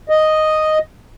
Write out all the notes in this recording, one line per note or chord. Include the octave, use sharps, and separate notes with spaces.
D#5